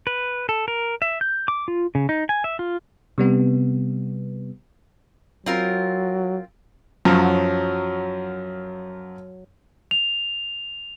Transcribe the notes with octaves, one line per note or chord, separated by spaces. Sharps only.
B4
A4
A#4
E5
G6
D6
F4
C#3
D#4
G#5
E5
F4
C3 G3 B3
F#3 C4 F4 A#4
F#2 F3 F#3
F7